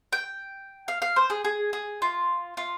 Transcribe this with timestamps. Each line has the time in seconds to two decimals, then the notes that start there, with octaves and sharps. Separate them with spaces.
0.13 G5
0.88 F5
1.02 F5
1.16 C5
1.30 G#4
1.45 G#4
1.73 G#4
2.02 F4
2.57 F4